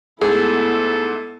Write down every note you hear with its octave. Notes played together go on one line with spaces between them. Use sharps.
G#2 A3 B3 E4 G#4 A4